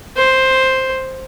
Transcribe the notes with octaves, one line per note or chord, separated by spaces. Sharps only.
C5